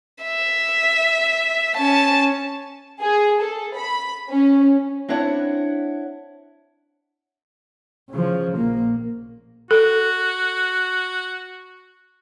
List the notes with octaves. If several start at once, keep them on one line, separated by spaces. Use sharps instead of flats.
E5
C#4 A5
G#4
A4
B5
C#4
C4 D4 E4 C#5 F#5
C#3 F3
A#1 A#3
F#4 A4